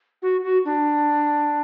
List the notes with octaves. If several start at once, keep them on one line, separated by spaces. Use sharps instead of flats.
F#4
F#4
D4